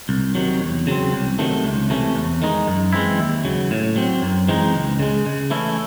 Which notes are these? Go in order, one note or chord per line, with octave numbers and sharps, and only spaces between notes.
C2
C3 D#3 F#3
E2
C#3 F#3 C4
C2
C3 D#3 F#3 A3
C#2
C3 E3 A3 C#4
E2
D#3 G#3 D#4
F#2
E3 G#3 C4 E4
D#2
C#3 F#3
A2
F#3 C4
F#2
E3 G#3 C4 D#4
C#2
C#3 G#3
C#3
E3 A3 C#4 E4